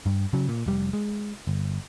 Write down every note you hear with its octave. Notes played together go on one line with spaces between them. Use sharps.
G2
C#3 F#3
A#2
F1 G3
G#3
G1